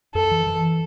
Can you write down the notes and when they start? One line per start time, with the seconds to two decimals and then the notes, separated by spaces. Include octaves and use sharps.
0.15 F#2 A4
0.31 E3
0.47 E3